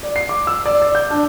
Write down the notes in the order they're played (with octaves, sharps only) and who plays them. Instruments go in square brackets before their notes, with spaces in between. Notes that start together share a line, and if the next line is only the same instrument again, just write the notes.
[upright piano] D5
C7
D6
E6
D5
D5
G6
D4